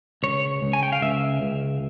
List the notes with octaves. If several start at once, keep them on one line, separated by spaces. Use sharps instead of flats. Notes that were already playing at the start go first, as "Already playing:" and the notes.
C#2 C#5
C#2
G#5
G5
F5
C#2 E5
C#2